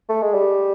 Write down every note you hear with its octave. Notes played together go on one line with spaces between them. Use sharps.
A3
G#3
G3